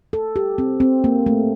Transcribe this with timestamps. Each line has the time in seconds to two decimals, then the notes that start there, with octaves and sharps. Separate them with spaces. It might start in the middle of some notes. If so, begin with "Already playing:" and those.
0.13 A4
0.36 G4
0.58 C4
0.80 C4
1.04 A#3
1.26 A3